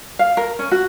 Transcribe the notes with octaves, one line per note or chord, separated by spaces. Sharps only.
F5
A#4
C#4
F#4